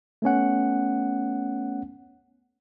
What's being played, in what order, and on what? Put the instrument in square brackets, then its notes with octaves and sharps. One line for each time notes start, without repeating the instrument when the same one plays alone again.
[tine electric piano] A3 B3 C#4 F#5